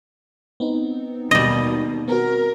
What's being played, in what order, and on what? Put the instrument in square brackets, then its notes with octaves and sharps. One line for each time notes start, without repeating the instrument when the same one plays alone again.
[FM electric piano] B3 C4 D#4
[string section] D#2 B2 [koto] G3 D#5
[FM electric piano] B3 C4 F#4 [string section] A#4